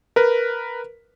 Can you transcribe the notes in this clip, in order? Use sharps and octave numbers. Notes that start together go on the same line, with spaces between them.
A#4 B4